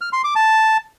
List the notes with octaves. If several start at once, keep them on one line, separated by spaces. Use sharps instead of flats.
F6
C6
D6
A5